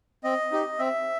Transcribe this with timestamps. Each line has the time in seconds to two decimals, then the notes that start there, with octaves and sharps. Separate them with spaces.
0.24 C4 D#5
0.52 D#4 G4
0.79 C4 E5